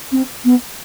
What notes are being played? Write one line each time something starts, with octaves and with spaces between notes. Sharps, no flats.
C4
B3